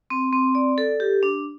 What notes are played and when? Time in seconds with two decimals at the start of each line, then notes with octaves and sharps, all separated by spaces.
0.10 C4
0.32 C4
0.55 D5
0.78 A4
1.00 G4
1.23 D4